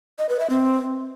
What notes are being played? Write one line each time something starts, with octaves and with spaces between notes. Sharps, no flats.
D#5
B4
E5
C4